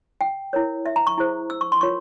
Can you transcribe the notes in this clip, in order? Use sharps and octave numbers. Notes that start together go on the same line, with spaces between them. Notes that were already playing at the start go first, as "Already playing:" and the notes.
G5
E4 A#4 C#5
E5
A#5
C#6
E4 G#4 C5
E6
C#6
C6
F4 A#4 C#5 C#6